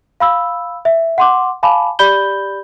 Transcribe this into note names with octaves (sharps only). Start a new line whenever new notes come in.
F5 B5 E6
E5
F#5 C6 D6
F5 G#5 A5 B5 D6
G4 D5 B5 G6 G7